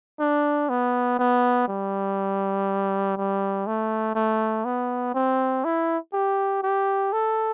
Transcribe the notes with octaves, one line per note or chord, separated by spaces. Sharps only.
D4
B3
B3
G3
G3
A3
A3
B3
C4
E4
G4
G4
A4